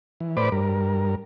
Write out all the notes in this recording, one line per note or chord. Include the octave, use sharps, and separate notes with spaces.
E3
A2 B4 C5 D5 B5 D6
G2 A#4